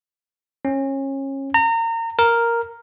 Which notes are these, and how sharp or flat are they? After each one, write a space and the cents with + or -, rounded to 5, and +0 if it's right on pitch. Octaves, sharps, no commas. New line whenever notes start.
C#4 -30
A#5 -30
A#4 +0